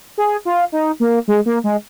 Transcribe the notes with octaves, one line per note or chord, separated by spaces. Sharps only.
G#4
F4
D#4
A#3
G#3
A#3
G#3